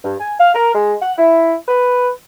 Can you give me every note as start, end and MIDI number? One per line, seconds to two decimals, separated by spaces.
0.05 0.15 43
0.20 0.34 80
0.40 0.53 77
0.55 0.72 70
0.75 0.94 56
1.02 1.13 78
1.19 1.56 64
1.69 2.10 71